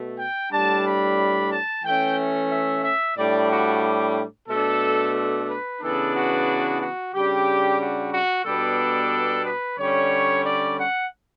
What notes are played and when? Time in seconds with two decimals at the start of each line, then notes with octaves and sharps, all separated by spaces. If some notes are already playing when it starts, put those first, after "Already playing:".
Already playing: B2 A3
0.19 G5
0.52 A2 G3 D4 A5
0.86 B5
1.51 A5
1.84 E3 A3 C#4 G5
2.51 E5
2.84 E5
3.17 A2 G3 D4 D5
3.50 F#4
4.49 B2 A3 D4 A4
5.15 A4
5.49 B4
5.82 C#3 E3 B3 D4 A4
6.14 F#4
6.81 F#4
7.14 C#3 G3 D4 G4
7.80 F#4
8.12 F#4
8.46 B2 G3 B3 D4 A4
9.45 B4
9.78 D3 G3 C#4 C#5
10.44 D5
10.78 F#5